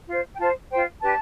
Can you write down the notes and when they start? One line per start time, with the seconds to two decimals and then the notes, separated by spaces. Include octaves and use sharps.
0.08 F4 C5
0.32 G5
0.38 F4 C5 A5
0.70 F4 C5 G5
1.01 D4 G4 B4 A5